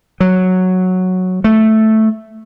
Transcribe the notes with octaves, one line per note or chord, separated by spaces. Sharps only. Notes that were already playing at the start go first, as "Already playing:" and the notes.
F#3
A3